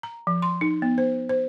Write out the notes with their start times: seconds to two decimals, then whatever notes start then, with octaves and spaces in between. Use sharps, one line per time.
0.03 A#5
0.27 F3
0.42 C6
0.61 D#4
0.82 B3
0.98 C5
1.29 C5